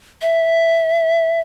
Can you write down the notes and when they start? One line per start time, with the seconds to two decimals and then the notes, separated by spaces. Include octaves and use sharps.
0.22 E5